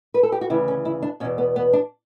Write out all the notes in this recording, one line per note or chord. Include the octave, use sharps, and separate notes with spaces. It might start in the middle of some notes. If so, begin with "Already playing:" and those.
B4
A4
G4
F#4
D2 C#3 E3 E4
C#4
E4
D4
E2 B2 C#4
B3
B3
D4